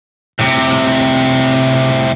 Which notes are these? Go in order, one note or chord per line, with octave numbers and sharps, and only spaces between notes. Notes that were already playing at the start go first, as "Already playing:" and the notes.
A2 C3